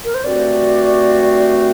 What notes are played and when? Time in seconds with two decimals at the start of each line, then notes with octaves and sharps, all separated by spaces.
0.05 A#4
0.14 C5
0.24 G2 D3 A3 C4 F#4 D5